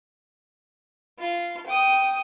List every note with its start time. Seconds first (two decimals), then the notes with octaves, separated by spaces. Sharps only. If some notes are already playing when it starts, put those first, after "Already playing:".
1.19 F4
1.66 G5 D#6